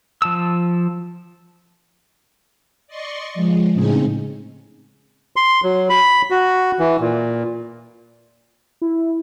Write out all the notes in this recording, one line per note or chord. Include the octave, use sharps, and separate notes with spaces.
F3 A5 E6
D5 D#5 C6 C#6
F3 G#3
A2 C#3 C4 C#4 D#4 G#4
C6
F#3
B5
F#4
E3
A#2
E4